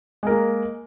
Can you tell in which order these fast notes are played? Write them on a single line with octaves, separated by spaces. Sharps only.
G#3 A#4 A#3